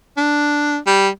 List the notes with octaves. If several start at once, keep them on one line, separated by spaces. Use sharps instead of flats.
D4
G3